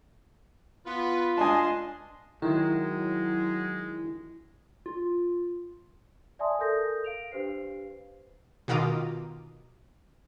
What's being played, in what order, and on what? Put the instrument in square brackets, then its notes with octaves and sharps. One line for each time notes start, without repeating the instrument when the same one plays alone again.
[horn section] B3 B4 [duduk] F4
[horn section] D4 C6 [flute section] D#5 D#6 [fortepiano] G#5 A5
[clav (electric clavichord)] D#3 [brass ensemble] F#3 [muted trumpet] G#3 [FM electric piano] E4
[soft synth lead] F4
[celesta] D5 E5 G#5 A5 C6 D#6
A4 A#4 D#6 G6 A#6
F5 D7 F7
D4 G4 B4 C5 F5 C7
[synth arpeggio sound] B2 D#3 F4 A#5 D6 D#6